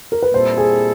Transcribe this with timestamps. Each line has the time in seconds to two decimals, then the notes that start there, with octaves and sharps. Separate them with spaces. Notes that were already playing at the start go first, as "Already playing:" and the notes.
0.12 A#4
0.23 B4
0.33 A#2 G3 C4 E4 A4 C5
0.58 G#4